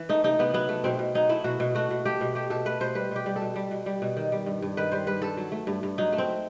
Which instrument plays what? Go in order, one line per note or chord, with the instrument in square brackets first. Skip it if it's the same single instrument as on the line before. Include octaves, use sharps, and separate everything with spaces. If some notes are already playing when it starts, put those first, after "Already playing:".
Already playing: [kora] E3
A3 D#4
C3 D#4
C3 B3
F#3 B3
A3
B2 C4
B2
F#3 D#4
A3 E4
B2 F#4
B2
A3 F#4
B2
A3 G4
B2
A3 G4
B2 A4
A3 B4
B2 C5
G3 B4
B2 G4
G3
A4
B2
G3
B2
G3
B2
D#3
G3
G2
G2
D#3 B4
G3 C5
G2 B4
G2 A4
F#3
A3
G2
G2
F#3 D#4
A3
C4